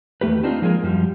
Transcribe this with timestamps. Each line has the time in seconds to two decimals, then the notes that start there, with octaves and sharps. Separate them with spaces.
0.21 E2 D#3 A3 G4 B4
0.43 C4 D4 D#4 F4
0.62 F3 G#3 A#3 G#4 A#4
0.83 F#2 F3 G3